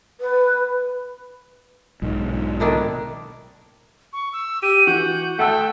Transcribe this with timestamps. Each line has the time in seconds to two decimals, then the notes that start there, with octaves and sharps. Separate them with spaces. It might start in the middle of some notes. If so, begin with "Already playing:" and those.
0.20 B4
2.02 B1 G#2
2.60 D#3 D4 E4
4.13 C#6
4.33 E6
4.63 G4 D#7
4.87 E3 F#4 G6
5.39 A3 F#5 G5 A5 E6